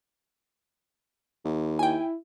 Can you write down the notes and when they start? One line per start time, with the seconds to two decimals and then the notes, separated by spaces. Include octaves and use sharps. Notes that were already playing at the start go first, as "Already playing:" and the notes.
1.45 D#2
1.79 E4 G5 G#5